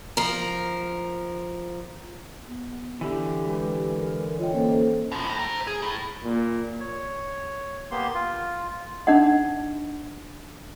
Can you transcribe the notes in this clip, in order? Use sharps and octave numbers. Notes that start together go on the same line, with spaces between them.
F3 A#4
B3
D3 E3 G4
G#3 G4 B4
A#4
F4 C#5 D#5 G5
A#3 C#4 A4 C5
B2 F3
A5 B5
C5 A#5
G#4
A2
A#2
C#5
A#3 B3 G4 C6
F4
D4 D#4 D#5 F#5